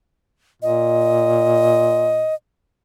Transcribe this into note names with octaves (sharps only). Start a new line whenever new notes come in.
A#2 D#5